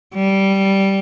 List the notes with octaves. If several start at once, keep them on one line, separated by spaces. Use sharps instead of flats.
G3